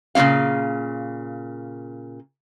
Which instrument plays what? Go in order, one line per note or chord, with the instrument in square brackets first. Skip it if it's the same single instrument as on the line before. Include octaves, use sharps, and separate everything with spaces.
[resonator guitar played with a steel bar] A#2 C#3 A#3 C#4 F5